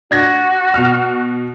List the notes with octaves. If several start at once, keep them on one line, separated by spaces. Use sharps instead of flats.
D4 F#4 G#6 A#6
B2 F6